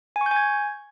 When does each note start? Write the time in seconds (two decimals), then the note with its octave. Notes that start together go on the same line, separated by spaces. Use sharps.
0.16 G#5
0.21 C#6
0.26 G6
0.31 G#5
0.36 G#6